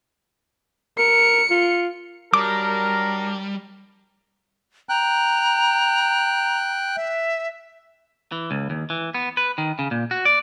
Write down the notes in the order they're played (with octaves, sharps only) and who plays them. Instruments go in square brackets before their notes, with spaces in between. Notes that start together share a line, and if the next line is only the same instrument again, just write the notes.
[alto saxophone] A#4 [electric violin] C#7
[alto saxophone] F4
[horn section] F#3 D4 A#4 [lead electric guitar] G3 [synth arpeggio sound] D6
[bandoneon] G5 F#6 [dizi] A#5
[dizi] E5
[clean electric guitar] E3
C#2
D#2
E3
B3
B4
D#3
C#3
A#2
F#4
D5